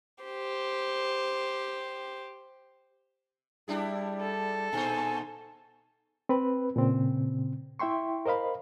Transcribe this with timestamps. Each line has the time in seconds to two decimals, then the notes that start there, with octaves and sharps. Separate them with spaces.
0.24 G4 C5
3.68 G3 D4 E4 G#4
4.21 A4
4.73 A#2 D#4 C5 G#5
6.29 C4 B4 B5
6.76 A#2 C#3 C4
7.79 E4 E5 G5 C6 C#6
8.26 A#4 C5 D#5 F5 B5